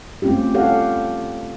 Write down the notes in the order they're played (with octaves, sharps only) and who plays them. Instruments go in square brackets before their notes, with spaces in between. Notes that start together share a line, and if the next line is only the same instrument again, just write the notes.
[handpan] A3 C4 C#4 F4 G4
F4 G4 A4 C#5 F5 F#5